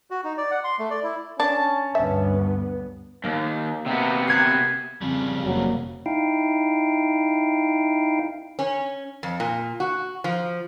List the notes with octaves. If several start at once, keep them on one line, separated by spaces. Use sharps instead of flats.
F#4
D#4
D5
F#5
C6
A3
D5
E4
C#4 D4 A5
D2 G2 B3 E5
D#2 A#3
C3 B3
F#6 G#6 C7
F2 C#3 G3
F1 F#3 A#3
D#4 E4 F5 G5
C#4
F2
A#2
F#4
F3